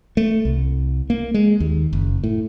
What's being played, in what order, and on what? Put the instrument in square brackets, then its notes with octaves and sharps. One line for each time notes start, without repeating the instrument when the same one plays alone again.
[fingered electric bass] A3
C2
A#3
G#3
D#2
F#1
A2